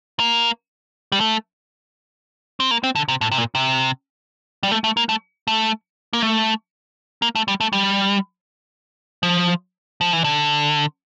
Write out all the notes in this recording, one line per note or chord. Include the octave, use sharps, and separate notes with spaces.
A#3
G3
A3
C4
A#3
C4
D3
C3
A2
C3
A#2
C3
G3
A3
A3
A#3
A3
A3
A#3
A3
A#3
A3
G3
A3
G3
F3
F3
E3
D3